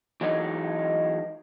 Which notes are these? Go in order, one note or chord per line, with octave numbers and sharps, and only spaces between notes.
E3 F#3 G#3 D#4